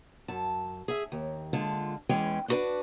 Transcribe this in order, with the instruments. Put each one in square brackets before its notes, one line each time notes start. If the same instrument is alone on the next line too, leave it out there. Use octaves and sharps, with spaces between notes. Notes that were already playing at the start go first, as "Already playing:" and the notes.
[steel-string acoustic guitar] F#2 A5
G#4 E5
D#2
D3 G#3 F4 A5
E2 E3 G#3 C#4 G5
D4 D#4 F#4 A#4 B4 D5